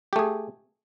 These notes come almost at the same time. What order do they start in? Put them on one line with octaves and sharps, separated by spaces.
G4 A3 G#4